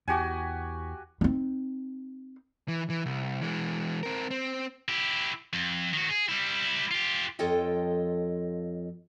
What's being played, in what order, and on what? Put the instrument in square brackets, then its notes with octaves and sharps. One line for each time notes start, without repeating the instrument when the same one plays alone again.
[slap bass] E2 [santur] F#4 G4 G#5
[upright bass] C4 D#4
[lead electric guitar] E3
E3
C2
E3 G#3
C4 A#4
C4
[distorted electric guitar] E4 G4
F2
D#3 F#4
G#4
G3 E4
F4 G4
[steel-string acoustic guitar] F2 F4 A4 C#5 D#5 G5